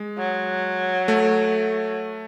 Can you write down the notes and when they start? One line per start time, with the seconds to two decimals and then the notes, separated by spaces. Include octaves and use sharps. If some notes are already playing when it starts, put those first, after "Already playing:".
Already playing: G#3
0.18 F#3
1.08 A3